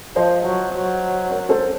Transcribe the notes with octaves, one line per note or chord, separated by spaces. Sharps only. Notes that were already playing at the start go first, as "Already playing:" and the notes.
F3 C5 D#5
F#3
F#3
A#4 C#5
A4 C5